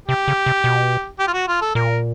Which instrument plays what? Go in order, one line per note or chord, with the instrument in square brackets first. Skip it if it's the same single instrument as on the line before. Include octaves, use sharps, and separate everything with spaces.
[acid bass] C3 [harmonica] G4
[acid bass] C#3
C3
B2
[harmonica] G4
F4
F#4
F4
A4
[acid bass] A#2 [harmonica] A#4